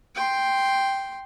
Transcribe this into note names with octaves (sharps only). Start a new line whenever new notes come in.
G5 C6